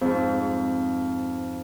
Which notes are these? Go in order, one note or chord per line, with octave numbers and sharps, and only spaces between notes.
F2 G#2